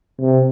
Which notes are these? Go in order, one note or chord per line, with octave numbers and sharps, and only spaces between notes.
C3